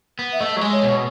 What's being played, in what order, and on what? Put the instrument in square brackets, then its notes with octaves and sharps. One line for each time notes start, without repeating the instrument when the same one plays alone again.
[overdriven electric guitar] B3
[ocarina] E5
[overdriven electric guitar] A3 [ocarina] D#5
[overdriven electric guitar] F#3
G#3
[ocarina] C#5
[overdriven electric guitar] B2